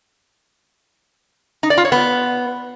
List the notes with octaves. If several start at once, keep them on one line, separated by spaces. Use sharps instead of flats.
D#4
D5
F4
C#5
B3